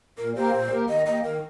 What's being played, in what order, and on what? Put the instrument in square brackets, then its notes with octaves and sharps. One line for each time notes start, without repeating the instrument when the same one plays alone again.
[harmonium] A#2 [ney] A#4
[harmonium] A#3 G4 A#4 [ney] C5
[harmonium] A#2
A#3 G4 A#4
[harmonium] D#3 [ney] D#5
[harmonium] A#3 G4 [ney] D#5
[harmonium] D#3 [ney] A#4